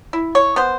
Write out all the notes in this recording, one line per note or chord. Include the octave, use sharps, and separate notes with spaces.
E4
C#5
B3 C5